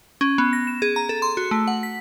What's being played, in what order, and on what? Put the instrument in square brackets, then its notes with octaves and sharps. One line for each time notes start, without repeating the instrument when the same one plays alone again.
[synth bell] C#4
B3
A#6
E7
G#4
A#5
A4
C6
F#4
A3
F#5
B6